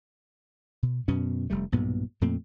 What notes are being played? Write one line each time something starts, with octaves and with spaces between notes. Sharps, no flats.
B2
F#2 B2 B3 C#4
F1 G3 A3
B1 G2 A#2 B3
F2 A#2 A3 C4